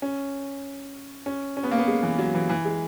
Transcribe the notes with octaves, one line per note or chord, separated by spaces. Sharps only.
C#4
C#4
C#4
B3
A#3
B3
G#3
E3
F#3
E3
E3
G#3